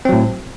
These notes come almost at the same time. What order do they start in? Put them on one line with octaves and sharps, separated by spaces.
C4 F#3 A2